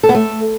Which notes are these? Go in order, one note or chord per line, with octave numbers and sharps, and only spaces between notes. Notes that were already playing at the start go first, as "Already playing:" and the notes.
A4
B3
A3